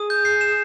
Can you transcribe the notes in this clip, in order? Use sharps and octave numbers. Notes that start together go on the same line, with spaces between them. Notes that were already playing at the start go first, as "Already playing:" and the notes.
Already playing: G#4 D#6
G6
C7
E7